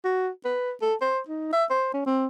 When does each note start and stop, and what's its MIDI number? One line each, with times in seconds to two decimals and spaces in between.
0.05 0.29 66
0.45 0.72 71
0.82 0.94 69
1.01 1.20 72
1.28 1.50 63
1.53 1.65 76
1.70 1.90 72
1.94 2.06 61
2.06 2.27 60